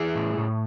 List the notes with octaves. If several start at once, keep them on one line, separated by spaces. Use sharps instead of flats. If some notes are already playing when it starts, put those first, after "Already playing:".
Already playing: E3 E4 G#4
A2
A2